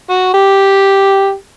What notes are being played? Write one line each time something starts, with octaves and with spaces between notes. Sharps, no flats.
F#4
G4